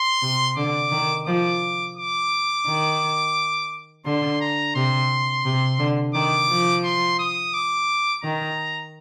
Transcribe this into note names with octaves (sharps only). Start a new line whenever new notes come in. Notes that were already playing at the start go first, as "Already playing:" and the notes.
Already playing: C6
C3
D3 D6
D#3
F3 D6
D6
D#3
D3 C6
A#5
C3 C6
C3
D3
D#3 D6
F3
C6
D#6
D6
D#3 A#5